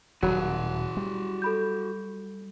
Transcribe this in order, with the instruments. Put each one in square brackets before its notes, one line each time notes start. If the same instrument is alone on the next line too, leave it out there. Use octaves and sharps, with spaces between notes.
[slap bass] D#1 B2 [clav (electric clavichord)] F#3 [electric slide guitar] F#4 G#4
[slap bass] G3
[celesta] A4 B5 G6